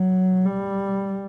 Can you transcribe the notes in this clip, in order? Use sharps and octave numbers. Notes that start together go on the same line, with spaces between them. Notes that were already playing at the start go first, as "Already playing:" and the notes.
Already playing: F#3
G3